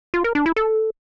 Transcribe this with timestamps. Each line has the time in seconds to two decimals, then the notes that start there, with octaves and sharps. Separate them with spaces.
0.14 F4
0.24 A#4
0.35 D4
0.46 E4
0.56 A4